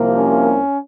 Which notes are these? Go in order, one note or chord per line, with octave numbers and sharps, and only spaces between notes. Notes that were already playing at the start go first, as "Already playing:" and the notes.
Already playing: C2 C3 F3 A#3
C#4